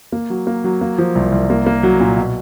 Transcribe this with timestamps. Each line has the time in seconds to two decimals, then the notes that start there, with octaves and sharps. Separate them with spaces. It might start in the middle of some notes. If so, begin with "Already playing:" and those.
0.12 A#3
0.30 F#3
0.47 A#3
0.64 F#3
0.81 A#3
0.98 F3
1.15 C2
1.32 C2
1.50 A#3
1.67 A#3
1.83 F#3
2.00 A#2
2.17 B2